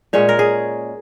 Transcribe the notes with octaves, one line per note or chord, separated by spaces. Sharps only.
A#2 G#3 C#4 C#5
A#4
G#4